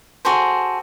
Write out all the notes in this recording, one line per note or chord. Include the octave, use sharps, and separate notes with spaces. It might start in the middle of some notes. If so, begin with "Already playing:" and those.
F#4 G#4 A4 C5